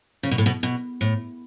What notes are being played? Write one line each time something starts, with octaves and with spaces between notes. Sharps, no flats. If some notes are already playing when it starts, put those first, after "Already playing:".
C#3
B2
A2
B2
B2
A2